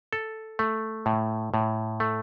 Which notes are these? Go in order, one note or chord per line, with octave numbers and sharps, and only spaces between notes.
A4
A3
A2
A2
A3